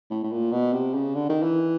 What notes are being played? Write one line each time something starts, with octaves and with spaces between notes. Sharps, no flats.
A2
A2
A#2
B2
C3
C#3
D3
D#3
E3